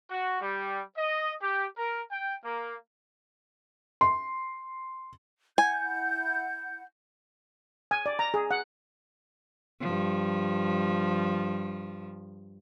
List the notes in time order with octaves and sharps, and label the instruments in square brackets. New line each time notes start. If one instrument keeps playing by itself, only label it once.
[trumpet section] F#4
G3
D#5
G4
A#4
G5
A#3
[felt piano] C6
[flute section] E4 F#5 G6 [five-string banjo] G#5
[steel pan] G#5
D5
A#5
G#4
F#5
[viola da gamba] G2 F3